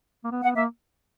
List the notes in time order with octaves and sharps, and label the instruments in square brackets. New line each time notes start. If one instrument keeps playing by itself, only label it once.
[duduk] A#3
B3
[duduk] B3 [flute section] F#5
[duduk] A#3 [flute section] E5